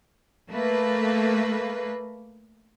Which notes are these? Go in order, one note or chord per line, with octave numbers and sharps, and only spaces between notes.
A3 A#3 B4